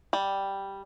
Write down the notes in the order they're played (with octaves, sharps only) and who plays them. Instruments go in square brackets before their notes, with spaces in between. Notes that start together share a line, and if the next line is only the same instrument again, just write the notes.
[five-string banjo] G3